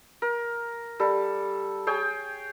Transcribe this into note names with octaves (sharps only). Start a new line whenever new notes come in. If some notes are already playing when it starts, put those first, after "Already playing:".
A#4
G3 A4
G#4 C#5 G5